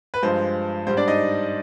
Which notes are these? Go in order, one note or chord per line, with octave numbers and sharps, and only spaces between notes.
B4
G2 F3 G#3 C5
G#2 G3 C5
D4 D5
D#4 D#5